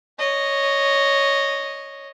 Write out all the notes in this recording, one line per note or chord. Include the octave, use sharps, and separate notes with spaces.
C#5 D#5